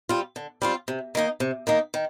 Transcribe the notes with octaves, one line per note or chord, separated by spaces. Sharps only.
G3 C4 F4
D3
G3 C4 F4
C3
D#3 A#3 D#4
C3
D#3 A#3 D#4
D#3